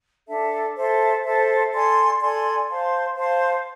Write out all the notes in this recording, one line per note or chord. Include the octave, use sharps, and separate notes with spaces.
D4 A4 E5 A5
A4 C5 E5 A5
A4 C5 E5 A5
A4 D5 G#5 C6
A4 D5 G#5 C6
C5 F5 A5 C6
C5 F5 A5 C6